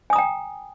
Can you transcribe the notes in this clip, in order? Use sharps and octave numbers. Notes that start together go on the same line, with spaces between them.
G5 G#5 A#5 D#6